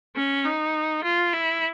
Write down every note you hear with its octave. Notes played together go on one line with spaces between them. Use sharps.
C#4
D#4
F4
E4